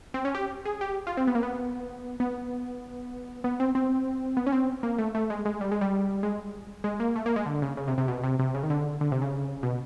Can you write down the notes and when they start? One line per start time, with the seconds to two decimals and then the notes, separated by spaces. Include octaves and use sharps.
0.14 C4
0.25 C#4
0.35 G4
0.65 G#4
0.81 G4
1.07 F4
1.17 C4
1.27 B3
1.35 A#3
1.43 B3
2.20 B3
3.44 B3
3.60 C4
3.75 C4
4.37 B3
4.46 C#4
4.52 C4
4.83 A#3
4.99 A3
5.15 A3
5.30 G#3
5.45 G#3
5.61 G3
5.72 G#3
5.81 G3
6.23 G#3
6.84 G#3
7.00 A#3
7.16 A3
7.26 A#3
7.36 G#3
7.46 D3
7.62 C#3
7.77 C#3
7.88 C3
7.98 C3
8.08 B2
8.24 C3
8.39 C3
8.55 C#3
8.63 D#3
8.70 D3
9.01 D3
9.12 C3
9.22 C#3
9.63 B2